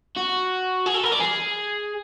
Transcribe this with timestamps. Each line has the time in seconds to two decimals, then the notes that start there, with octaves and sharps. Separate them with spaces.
0.16 F#4
0.86 G#4
0.94 A4
1.04 A#4
1.12 D5
1.20 G#4